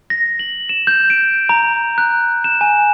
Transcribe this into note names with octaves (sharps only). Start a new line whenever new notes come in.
A#6
F#7
E7
G6
D7
A#5
F#6
E7
G#5